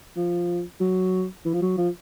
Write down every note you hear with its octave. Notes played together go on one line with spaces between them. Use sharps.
F3
F#3
E3
F3
F#3
F3